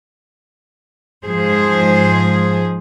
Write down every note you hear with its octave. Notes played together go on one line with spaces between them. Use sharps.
G#2 F3 G#4 C5